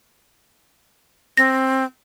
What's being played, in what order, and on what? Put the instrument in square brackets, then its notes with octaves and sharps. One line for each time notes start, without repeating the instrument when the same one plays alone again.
[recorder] C4 [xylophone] A#6